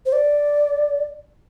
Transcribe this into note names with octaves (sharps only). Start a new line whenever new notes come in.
C5
D5